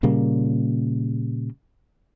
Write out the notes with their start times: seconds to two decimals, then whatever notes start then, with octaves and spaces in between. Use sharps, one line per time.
0.03 A#2 C#3 G3 A#3